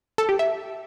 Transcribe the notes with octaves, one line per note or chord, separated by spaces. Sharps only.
A4
G4
E5